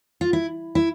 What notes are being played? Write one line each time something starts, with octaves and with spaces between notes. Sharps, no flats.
F4
E4
E4